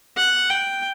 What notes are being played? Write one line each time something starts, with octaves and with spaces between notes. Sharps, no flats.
F#5
G5